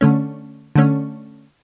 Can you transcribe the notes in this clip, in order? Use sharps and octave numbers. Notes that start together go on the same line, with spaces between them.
D3 A3 C#4
D3 A3 C#4